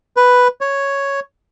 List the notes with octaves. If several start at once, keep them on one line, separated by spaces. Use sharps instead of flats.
B4
C#5